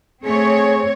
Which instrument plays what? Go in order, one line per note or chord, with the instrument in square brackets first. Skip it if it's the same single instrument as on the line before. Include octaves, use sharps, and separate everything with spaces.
[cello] A3 [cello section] C4 C#5 [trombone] G#4